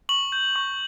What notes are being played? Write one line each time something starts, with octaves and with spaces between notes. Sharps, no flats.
C#6 F#7
G6
C#6